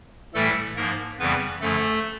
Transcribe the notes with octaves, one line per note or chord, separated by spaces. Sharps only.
A2 E3 G3 A3 A4
G#2 F3 A#3 A#4
F2 C#3 E3 G3 B3 B4
F#2 D3 F3 A3 A4